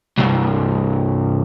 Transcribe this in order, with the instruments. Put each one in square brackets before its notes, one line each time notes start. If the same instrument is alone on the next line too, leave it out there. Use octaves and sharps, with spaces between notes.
[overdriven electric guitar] C2 G2